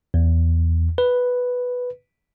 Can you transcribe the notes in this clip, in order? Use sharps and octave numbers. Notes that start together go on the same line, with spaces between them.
E2
B4